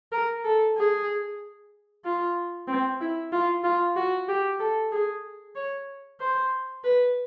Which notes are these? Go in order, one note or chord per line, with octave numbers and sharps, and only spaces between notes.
A#4
A4
G#4
F4
C4
E4
F4
F4
F#4
G4
A4
G#4
C#5
C5
B4